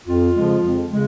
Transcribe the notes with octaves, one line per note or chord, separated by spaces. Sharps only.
F2 F4
C#3 F3 G#3
F2
C#3 G#3